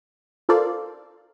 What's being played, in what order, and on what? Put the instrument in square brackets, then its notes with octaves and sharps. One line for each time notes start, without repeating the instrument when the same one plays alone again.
[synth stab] F4 A4 A#4 C5 D5 F5